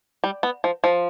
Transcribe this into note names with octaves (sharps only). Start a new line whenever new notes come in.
G3
B3
F3
F3